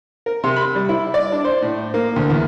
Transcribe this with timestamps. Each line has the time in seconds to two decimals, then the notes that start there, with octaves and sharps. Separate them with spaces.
0.26 A#4
0.44 C3
0.56 B5
0.75 G3
0.89 E4
1.14 D5
1.32 D4
1.44 C5
1.62 A2
1.94 A#3
2.16 D2
2.30 E2